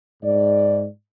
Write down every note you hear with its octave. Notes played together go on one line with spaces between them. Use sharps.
G#2 D5